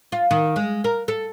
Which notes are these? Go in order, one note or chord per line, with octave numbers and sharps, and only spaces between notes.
F4
D#3
G#3
A#4
A4